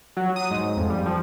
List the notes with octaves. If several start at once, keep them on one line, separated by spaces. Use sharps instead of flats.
F#3
D#6
G#2
F2
G3
F3